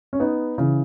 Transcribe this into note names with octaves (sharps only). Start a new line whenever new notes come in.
C#4
B3 D#4
C#3 E3